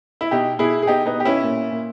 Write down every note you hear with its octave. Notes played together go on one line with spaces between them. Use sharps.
E4
B2 D#4 G4
B2 E4 G#4
G#4
B2 D#4 G4
B3 D#4
B2 G4
C#4 E4
A#2
A#2